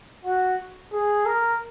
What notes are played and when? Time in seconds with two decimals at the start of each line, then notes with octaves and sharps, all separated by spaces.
0.25 F#4
0.93 G#4
1.26 A#4